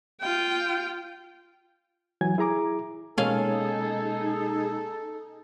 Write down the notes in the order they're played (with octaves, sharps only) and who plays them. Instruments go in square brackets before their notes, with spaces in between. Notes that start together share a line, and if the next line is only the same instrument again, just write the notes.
[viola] F4 G5
[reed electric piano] E3 F#3 G#5 G#6
E4 G#4 A#5 D6
[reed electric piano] B2 G#3 A#3 [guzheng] C#4 F5 [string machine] D#4 G#4 [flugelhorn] A4